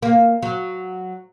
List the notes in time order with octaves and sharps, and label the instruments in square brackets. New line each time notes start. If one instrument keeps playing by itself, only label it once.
[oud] A#3
F#3